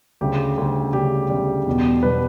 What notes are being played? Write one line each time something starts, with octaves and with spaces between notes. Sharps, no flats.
D2 C#3 G3 G4
D2 C#3 G3
D2 C#3 G3 G4
D2 C#3 G3
E2 B2 G3
B2 G3 B4